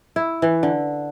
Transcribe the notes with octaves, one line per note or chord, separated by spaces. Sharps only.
E4
E3
D3